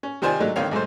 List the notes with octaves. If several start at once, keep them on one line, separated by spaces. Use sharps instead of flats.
C#4
C3 D#3 F4 C5 D5 G#5
F#3 G#3 A3 D4 D#4
C#2 D3 D#3 C4 C#5 F5
B1 G#2 A3 C5